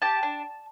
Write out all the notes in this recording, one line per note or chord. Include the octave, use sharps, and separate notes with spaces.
G4 A5
D4